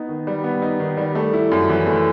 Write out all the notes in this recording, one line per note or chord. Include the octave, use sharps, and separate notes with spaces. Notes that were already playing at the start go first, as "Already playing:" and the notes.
Already playing: B3 D#4
D#3
G3
B3
D#4
D#3
G3
A3
E4
F#2
E3
A3